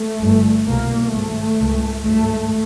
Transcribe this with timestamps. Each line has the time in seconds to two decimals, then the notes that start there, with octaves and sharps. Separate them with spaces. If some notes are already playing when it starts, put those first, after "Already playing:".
Already playing: A3
0.21 G1 G2
0.67 C2 B2 A#3
1.12 G#1 G#2 A3
1.59 C#2 C#3
2.05 G#1 G2 A3